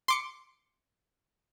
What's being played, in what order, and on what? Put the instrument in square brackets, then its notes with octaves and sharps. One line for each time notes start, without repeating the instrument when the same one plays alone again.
[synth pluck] C6 D6 C#7